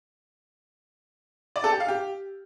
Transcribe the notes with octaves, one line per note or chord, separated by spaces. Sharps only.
D5
A4
G4
F5
G4